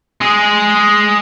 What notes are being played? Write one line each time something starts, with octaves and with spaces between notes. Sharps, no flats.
G#3 G#4